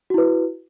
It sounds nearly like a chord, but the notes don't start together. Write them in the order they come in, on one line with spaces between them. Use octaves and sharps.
F#4 E4 B4